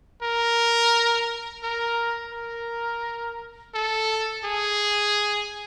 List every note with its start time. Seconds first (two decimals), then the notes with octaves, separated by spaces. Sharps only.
0.23 A#4
1.63 A#4
2.33 A#4
3.75 A4
4.45 G#4